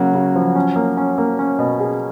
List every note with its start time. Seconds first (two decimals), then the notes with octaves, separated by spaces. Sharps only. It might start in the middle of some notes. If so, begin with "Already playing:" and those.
Already playing: C#3 F#3 A#3
0.14 C#3
0.36 F3
0.55 C#4
0.76 A#3
0.97 C#4
1.18 A#3
1.39 C#4
1.59 B2
1.80 G#4